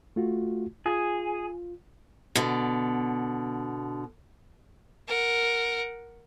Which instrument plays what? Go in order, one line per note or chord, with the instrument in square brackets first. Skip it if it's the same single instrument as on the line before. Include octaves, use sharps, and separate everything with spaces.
[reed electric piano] A3 F4 F#4
[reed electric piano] F4 [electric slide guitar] G#4
[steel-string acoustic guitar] B2 D3
[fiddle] A#4 F#5